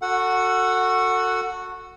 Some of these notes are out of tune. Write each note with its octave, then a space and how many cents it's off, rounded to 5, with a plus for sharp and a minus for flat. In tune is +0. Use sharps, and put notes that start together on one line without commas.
F#4 -15 A4 +25 F#5 +0